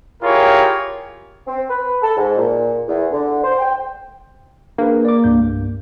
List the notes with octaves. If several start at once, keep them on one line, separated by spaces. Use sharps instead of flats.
E4 F4 G4 G#4 A#4 C#5
C4
B4
A4
G#2
A#2
E2
D3
C5
G5
A#3 D4 G#4 B4
D5 D6
C2 G2 G6